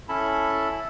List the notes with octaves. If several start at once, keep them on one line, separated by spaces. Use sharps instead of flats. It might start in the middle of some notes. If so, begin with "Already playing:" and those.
C#4 E4 A4 A5 B5